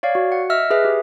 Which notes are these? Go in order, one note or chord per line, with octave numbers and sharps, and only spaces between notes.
C#5 D5 F5
F#4
F#5
D#5 E5 E6 F6
G#4 B4 E5
G4